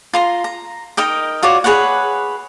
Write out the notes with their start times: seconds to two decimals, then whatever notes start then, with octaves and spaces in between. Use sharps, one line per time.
0.13 F4 A#5 C6
0.44 A#5
0.97 D#4 A#4 D#5 G5
1.42 F4 F#4 C#5 D5
1.64 G#4 B4 C#5 F#5